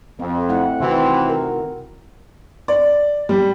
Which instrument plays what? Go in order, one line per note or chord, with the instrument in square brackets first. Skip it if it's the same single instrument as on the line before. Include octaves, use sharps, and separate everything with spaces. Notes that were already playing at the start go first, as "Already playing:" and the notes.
[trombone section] F2 [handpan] C4
[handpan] A3 E4 F#5
[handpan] C3 D#3 F#4 [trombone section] E3 C4
[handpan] A#4
[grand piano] D5
G3